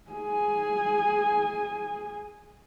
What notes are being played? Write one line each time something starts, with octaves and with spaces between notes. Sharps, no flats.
G#4 G#5